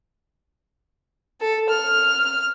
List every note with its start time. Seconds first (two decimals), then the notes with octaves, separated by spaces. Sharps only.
1.41 A4
1.70 F6